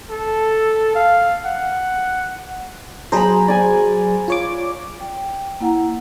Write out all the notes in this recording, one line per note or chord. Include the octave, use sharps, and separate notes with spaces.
A4
F5
F#5
F#3 G#4 C5 A#5 B5
D5 G#5
F4 C#5 D6
G5
A#3 E4 F#5 A#5